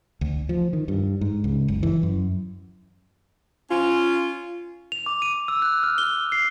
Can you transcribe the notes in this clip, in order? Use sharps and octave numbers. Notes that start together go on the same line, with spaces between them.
D2
F3
D#3
G2
G#2
C#2
F#1
E3
F#2
C#4 F4
F7
D6
D#7
E6
F#6
F6
G7
C7